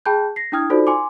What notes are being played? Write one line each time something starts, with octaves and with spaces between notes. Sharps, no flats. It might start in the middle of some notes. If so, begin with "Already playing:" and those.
G#4 G5 A5 B5 F#6 G6
A#6 C7
D4 E4 G5 D#6 F6 G#6
D#4 F4 F#4 A4 C5 D5
G#5 C6 D6